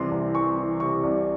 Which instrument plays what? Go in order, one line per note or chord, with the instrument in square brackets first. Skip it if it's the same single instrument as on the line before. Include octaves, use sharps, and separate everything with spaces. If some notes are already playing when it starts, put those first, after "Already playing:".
Already playing: [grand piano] C2 C3 E3 C6
C2
E3 C#6
E3
C3 C#6
C2